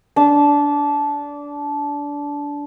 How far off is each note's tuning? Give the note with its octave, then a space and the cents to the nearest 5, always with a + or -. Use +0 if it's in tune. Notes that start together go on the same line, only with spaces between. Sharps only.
D4 -20